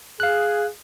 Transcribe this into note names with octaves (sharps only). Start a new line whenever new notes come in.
G#4 F5 F#6